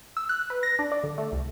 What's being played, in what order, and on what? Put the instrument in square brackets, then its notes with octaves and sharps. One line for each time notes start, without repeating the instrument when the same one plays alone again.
[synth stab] E6
F#6
B4
A#6
D4
D5
D3
A3
C2